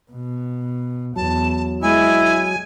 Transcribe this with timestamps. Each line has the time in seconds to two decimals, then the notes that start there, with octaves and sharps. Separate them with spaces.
0.11 B2
1.16 E2 F#3 A5
1.82 G#3 E4 G#5